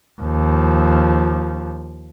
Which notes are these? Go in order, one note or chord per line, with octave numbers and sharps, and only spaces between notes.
D#2 F3